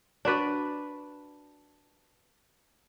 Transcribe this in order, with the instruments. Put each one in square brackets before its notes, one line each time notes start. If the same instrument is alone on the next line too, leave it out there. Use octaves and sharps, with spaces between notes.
[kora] D4 F#4 B4 D5